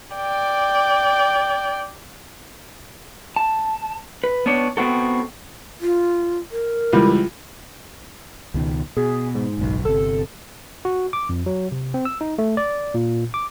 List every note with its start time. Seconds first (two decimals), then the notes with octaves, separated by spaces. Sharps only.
0.16 D5 G5
3.36 A5
4.24 B4
4.46 B3 D4 C#5
4.77 B3 C4 F#4 A4
5.81 F4
6.51 A#4
6.93 C#2 E3 G3
8.54 C#2 B2 D#3
8.97 B2 G#4
9.35 G#2
9.58 F#1 B1
9.85 G1 C3 A4
10.85 F#4
11.13 D6
11.29 F2
11.46 F#3
11.72 C3
11.94 C4
12.05 E6
12.21 D#4
12.38 A3
12.57 D5
12.94 A#2
13.34 D6